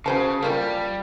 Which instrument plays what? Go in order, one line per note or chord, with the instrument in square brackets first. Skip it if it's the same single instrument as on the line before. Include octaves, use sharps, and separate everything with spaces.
[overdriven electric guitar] C#3 [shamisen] F#4 C5 A5
[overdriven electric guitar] G3 [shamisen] A#3 F4 A4